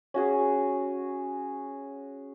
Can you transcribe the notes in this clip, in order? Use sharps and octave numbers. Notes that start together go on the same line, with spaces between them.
C#4 F#4 G#4